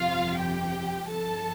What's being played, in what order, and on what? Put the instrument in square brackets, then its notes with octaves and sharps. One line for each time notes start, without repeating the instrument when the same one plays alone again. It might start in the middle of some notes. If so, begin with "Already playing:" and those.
Already playing: [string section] G1 F2 C3 F3 F4 F5
G4 G5
G1 G2 F3 A4 A5